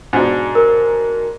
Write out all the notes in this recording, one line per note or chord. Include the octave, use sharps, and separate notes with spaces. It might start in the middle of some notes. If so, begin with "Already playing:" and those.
G#2 B2 D4
A#4